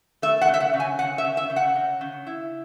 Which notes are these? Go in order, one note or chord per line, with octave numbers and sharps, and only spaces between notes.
A3 E5
F#5
C#3
E5
F#5
C#3
G#5
C#3 F#5
E5
C#3
E5
C#3
F#5
C#3
C#3
E4